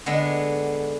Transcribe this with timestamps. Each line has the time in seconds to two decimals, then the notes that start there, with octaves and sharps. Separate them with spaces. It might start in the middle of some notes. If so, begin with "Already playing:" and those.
0.06 D3 G#3 B3